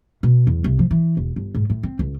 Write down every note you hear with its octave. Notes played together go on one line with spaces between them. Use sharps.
B2
E2
C2
F3
E3
E1
G1
G#2
A2
C4
C#2